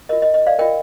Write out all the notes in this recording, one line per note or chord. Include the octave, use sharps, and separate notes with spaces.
F4 A#4 D#5
D#5
D#5
D5 F5
F4 A#4 D#5 G5